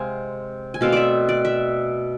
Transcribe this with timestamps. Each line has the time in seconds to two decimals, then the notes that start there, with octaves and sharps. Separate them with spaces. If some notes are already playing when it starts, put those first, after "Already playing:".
Already playing: C3 G#3 C4 F5 G#5
0.74 G#5
0.81 B2 A3 C4 F5
0.92 D5 E5
1.29 D5
1.45 E5